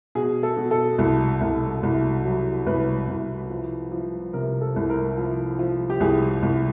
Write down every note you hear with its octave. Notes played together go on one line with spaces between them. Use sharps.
B2 G#4
A4
B2
A4
C2
C2
C2
F#3
C2 B4
C2
F3
F3
C3 A#4
A4
C2
A#4
F3
F3
G4
C2 G#4
C2